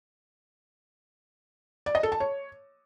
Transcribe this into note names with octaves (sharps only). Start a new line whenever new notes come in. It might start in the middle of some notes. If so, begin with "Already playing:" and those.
D5
D#5
A4
A5
C#5